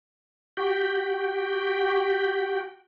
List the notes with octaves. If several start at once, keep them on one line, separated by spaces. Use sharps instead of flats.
F#4 G4 G5